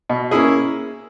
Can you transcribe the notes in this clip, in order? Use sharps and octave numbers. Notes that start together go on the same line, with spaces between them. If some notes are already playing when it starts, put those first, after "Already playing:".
B2
A#3 C#4 E4 G#4